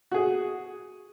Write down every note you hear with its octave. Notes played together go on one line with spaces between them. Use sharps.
F#4 G#4